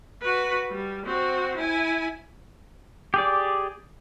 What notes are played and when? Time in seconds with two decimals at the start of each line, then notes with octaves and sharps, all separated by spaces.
0.22 F#4 B4
0.71 G3
1.06 C4 F#4
1.57 E4 G#5
3.14 G4 G#4 D5